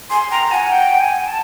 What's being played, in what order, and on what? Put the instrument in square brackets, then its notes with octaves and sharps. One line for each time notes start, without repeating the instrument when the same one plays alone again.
[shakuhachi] G#5 [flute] C6
[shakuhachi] G5 [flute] A#5
[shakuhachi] F#5 [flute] G#5
[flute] G5
G#5
A5